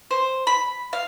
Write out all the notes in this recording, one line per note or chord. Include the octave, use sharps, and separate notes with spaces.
C5
B5
F5